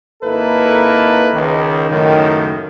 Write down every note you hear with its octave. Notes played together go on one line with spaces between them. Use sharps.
G#1 A#3 D#4 E4 A4 B4
C#2 D#3
C#2 F#2 A2 D#3